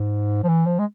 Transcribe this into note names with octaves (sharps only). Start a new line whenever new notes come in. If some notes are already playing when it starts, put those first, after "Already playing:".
Already playing: G#2
F3
E3
F3
G#3